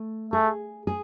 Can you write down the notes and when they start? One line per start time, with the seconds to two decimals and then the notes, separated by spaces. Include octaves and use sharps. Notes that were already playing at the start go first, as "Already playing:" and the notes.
Already playing: A3
0.33 A3 G#4
0.87 G#4